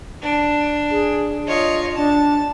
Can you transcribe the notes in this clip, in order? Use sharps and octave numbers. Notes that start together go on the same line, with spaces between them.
D4
G#4
F4 C#5 D#5
D4 A5